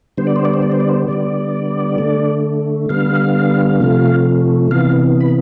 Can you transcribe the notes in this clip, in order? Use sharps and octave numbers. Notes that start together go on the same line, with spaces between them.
D3 G3 B3 C5
D5
C5
D5
C5
D5
C5
D5
C5
D3 G3 B3 D5
D3 A3
D3 G3 B3 F5
C3 F3 A3
C3 E3 B3 F5
B5